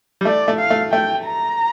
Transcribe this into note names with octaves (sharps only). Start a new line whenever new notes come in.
G3
A3 D5
A3
F5
A3
A3 G5
A#5